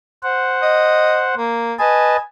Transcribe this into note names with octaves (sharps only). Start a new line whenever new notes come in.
C5 F#5
D#5
A#3
B4 D#5 G#5 A5